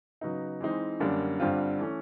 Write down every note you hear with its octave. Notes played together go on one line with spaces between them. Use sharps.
C#3 F#3 B3 D#4
E3 G#3 C4 D#4
F#2 D3 G3 A#3 D4
G2 D3 G3 C4 F4
E3 A3 C#4